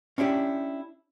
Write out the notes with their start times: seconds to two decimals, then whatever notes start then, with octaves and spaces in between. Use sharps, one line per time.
0.18 C#4 D4 E4 G4